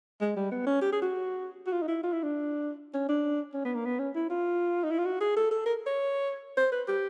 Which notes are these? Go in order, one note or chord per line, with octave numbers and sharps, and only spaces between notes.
G#3
G3
B3
C#4
G4
G#4
F#4
F#4
F4
D#4
E4
F4
E4
D4
C#4
D4
C#4
B3
A#3
B3
C#4
E4
F4
D#4
E4
F4
F#4
G#4
A4
A4
A#4
C#5
C5
B4
G4